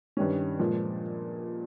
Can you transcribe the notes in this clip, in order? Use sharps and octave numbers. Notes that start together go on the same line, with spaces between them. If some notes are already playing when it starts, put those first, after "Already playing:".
G2 D#3 G3 C#4
A#2 F3 G#3